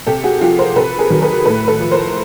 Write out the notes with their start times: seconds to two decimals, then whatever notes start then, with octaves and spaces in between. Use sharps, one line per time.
0.07 C3 G4 A4
0.24 F#4 G#4
0.41 F3 F4 G4
0.59 A#4 C5
0.76 C3 A4 B4
0.99 G#4 A#4
1.10 D#3 F#3
1.22 A4 B4
1.45 A2 A4 B4
1.67 A4 B4
1.80 F3
1.91 A#4 C5